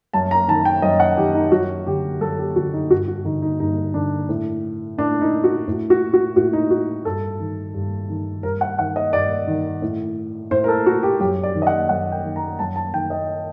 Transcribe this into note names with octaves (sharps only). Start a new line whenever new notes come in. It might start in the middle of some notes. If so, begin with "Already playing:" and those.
F#2 A5
A#5
D#3 A5
G5
F#2 D#5
F#5
D#3 G4
D#4
F#2 F#4
D3 G4
F#2 A4
G4
D3 F#4
D#4
G2 F#4
F#4
D3 D#4
D#4
G2 D#4
D3 D4
A2
A2 D4
D#4
F#4
A2
F#4
F#4
A2 F#4
D#4
F#4
G2 A4
D#3
G2
D#3
G2 A#4
F#5
D#3 F#5
D#5
G2 D5
D#3
A2
A2 C5
A#4
A4
F#4
G4
F#2 G4
D5
D#3
D#5
F#5
F#2 F#5
G5
D#3
A#5
F#2 A5
A5
D#3 G5
D#5